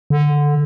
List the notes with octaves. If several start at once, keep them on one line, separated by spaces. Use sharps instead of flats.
D3